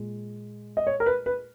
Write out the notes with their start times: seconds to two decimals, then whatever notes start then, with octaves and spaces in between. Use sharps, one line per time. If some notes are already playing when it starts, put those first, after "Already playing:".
Already playing: A#2 G#3
0.77 D#5
0.87 C#5
1.00 A#4
1.06 B4
1.26 B4